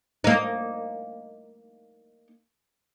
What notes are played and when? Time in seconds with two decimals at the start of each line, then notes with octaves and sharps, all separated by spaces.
0.24 A#3 D#4